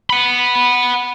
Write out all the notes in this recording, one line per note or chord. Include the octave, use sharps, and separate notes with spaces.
F#5 B5